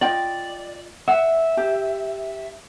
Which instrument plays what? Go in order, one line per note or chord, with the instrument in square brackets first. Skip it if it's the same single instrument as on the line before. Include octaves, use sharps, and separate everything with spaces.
[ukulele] F4 D#5 G5 [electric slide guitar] D5
[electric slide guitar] E5 [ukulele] F#5
[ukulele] G4